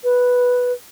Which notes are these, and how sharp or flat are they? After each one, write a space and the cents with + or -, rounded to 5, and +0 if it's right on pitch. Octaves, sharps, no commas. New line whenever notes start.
B4 +0